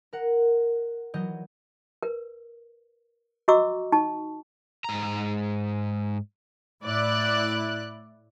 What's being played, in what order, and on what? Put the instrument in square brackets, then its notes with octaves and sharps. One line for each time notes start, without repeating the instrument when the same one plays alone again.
[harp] A#4 F#5
E3 F#3 D#5 G6
[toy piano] A#4 B4
F#4 D#5 A#5 C#6 D6 E6
D#4 A5 C#6
[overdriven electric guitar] G#2 A#5
[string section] A2 E4 D5 F#6